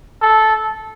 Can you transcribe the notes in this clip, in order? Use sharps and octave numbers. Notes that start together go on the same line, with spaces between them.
A4